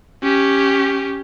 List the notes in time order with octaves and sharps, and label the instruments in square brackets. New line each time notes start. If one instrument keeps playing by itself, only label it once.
[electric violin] C#4 G4